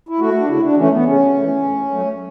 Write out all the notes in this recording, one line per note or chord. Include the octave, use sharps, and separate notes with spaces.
E4
A3 F#4
D4
C#3 E4
D4
E3 A3 C#4
B3
C#3 C#4
E3 A3
A2
F#3 A3